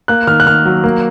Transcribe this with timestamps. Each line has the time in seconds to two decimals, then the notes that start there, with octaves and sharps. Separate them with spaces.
0.08 A#3 F#6
0.27 D#3 F6
0.40 F#6
0.46 D#3 F6
0.65 F#3
0.84 A#3